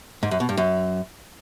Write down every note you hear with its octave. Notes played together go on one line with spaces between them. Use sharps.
G#2
F#2
B2
G2
F#2